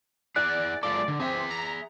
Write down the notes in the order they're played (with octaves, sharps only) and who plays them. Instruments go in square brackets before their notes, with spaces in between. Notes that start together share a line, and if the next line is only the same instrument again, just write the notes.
[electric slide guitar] E4 G#4 [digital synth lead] D5 [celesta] F#6
[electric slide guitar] G#3 F4 A4 [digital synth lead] D5 [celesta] D6
[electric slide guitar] D3
[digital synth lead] C4 [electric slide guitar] G#4 E5
[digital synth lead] A#5